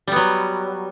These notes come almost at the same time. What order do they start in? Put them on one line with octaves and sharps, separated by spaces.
G3 B3 F#3